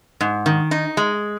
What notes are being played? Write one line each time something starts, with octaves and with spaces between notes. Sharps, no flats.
G#2
D#3
D#4
G#3